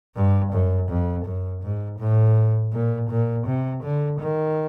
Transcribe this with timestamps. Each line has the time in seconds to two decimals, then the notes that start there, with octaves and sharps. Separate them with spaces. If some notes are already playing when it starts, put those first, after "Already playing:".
0.16 G2
0.52 F#2
0.90 F2
1.25 F#2
1.62 G#2
1.99 A2
2.72 A#2
3.10 A#2
3.46 C3
3.83 D3
4.20 D#3